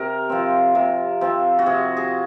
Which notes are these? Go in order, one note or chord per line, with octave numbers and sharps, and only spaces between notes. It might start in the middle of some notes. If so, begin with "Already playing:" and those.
Already playing: C3 A#4
F3 C4
C3
F3 C4
F#4
C3 G#4
G#4